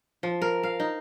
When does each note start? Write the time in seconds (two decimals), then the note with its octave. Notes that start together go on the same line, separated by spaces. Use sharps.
0.23 F3
0.42 A#4
0.63 F5
0.80 D#4